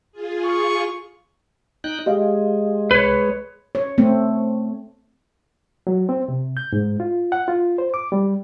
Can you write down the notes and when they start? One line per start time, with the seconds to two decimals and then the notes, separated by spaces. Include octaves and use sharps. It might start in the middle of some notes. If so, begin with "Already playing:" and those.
0.12 F4 G#4
0.44 C#6
1.84 D#4 G5 F#6
2.06 G#3 G4 D#5 F5
2.91 C2 B4 C#5
3.75 C#5
3.98 A3 C4
5.87 F#3
6.09 C4
6.28 C3
6.57 G6
6.73 G#2
7.00 F4
7.32 F#5
7.48 F4
7.78 C5
7.94 D6
8.12 G3